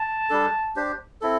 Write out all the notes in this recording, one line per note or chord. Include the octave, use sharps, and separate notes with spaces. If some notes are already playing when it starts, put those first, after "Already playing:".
Already playing: A5
G3 D4 A4
D4 G4 C5
C4 E4 A4